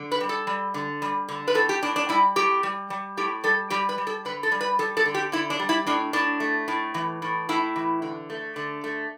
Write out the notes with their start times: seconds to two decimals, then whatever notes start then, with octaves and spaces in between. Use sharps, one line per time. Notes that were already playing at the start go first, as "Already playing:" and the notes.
Already playing: D3
0.12 B4
0.21 G3
0.29 A4
0.47 G3
0.74 D3
1.02 G3
1.29 D3
1.48 B4
1.55 A2 A4
1.69 G4
1.82 A2 D4
1.96 D4
2.09 G3 E4
2.36 A2 G4
2.63 G3
2.90 G3
3.17 A2 G4
3.44 G3 A4
3.70 G3 G4
3.89 B4
3.98 G3
4.07 A4
4.25 D3 B4
4.43 A4
4.52 G3
4.61 B4
4.79 G3 A4
4.97 A4
5.05 D3
5.14 G4
5.32 D3 E4
5.50 D4
5.59 G3
5.69 E4
5.87 A2 D4
6.13 A2 D4
6.40 A3
6.68 A2
6.94 E3
7.22 A2
7.49 A2 E4
7.76 E3
8.02 D3
8.30 A3
8.56 D3
8.84 A3